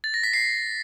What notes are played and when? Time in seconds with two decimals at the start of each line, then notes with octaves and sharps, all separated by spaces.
0.04 A6
0.14 A#6
0.23 B6
0.33 C7